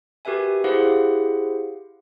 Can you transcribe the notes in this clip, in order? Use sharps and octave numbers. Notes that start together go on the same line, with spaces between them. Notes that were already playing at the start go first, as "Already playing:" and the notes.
F#4 G4 A#4 B4 E5 G#5
E4 G4 G#4 C5 F5 F#5